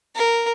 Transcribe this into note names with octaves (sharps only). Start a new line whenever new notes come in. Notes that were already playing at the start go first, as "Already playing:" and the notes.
A#4